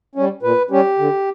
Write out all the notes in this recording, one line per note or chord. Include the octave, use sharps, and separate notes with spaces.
G3 C#4
A#2 B4
G3 C#4 G4
D3